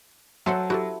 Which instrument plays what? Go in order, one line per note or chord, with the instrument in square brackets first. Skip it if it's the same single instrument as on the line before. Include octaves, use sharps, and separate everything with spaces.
[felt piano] F#3 [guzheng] A4 C5 F#5 [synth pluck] E5 C6
[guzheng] E4 [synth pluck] F#4 G4 A4